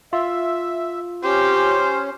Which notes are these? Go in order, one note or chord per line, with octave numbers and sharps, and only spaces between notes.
F4 E5
C#4 G4 C5